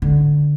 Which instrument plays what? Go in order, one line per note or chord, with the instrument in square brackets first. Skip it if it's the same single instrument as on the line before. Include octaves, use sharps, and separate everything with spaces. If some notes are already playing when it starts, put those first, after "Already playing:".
[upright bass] D3